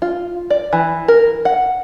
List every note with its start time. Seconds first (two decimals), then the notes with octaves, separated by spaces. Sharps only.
0.02 F4
0.50 D5
0.73 E3
1.08 A#4
1.45 F#5